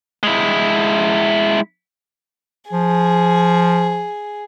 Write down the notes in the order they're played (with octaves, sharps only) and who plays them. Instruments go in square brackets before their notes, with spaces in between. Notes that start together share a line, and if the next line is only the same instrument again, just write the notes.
[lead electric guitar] G#3 E4
[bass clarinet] F3 [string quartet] G#4